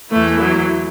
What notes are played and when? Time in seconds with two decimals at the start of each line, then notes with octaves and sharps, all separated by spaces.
0.12 E2 E3 A3
0.41 F#3